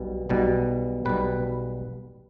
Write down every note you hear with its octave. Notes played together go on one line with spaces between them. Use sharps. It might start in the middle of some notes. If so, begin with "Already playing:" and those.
Already playing: B1 B2 G3
B1 B2 G3
B1 B2 G3 B4